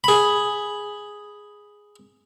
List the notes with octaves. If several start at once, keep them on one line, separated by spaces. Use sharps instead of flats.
G#4 B5